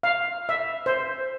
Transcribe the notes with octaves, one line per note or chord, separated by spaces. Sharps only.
F5
E5
C5